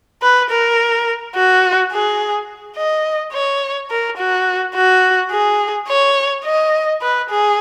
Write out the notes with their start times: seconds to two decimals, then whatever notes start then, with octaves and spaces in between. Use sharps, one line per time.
0.22 B4
0.50 A#4
1.35 F#4
1.92 G#4
2.76 D#5
3.33 C#5
3.90 A#4
4.18 F#4
4.75 F#4
5.31 G#4
5.88 C#5
6.45 D#5
7.02 B4
7.30 G#4